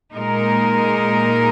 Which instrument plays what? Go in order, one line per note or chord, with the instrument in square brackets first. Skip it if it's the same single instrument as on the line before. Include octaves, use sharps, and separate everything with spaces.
[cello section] A#2 G#3 D#4 A#4